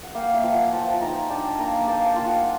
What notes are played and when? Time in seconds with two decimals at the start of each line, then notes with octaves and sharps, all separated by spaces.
0.03 F#5
0.15 A#3 F5 G5
0.34 E5 F#5
0.43 F3
0.53 F#5 G#5
0.73 F3 G5 A5
1.01 D#4 G#5 A#5
1.30 D4 G5 A5
1.58 A#3 G#5 A#5
1.87 A#3 G5 A5
2.06 G5 A5
2.16 F4
2.26 F#5 G#5